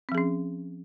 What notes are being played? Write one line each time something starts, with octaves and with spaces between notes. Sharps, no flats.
F3 C4 C#4 G#4